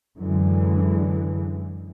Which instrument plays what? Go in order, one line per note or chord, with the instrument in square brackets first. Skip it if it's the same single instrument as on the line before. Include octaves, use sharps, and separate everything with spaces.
[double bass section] F#2 D3 E3 G#3